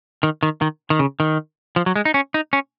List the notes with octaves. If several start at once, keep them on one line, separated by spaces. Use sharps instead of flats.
D#3
D#3
D#3
D#3
C#3
D#3
F3
F#3
G#3
D#4
C#4
D#4
C#4